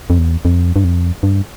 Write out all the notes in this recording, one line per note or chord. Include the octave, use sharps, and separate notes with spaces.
F2
E2
F2
G2
F2
G2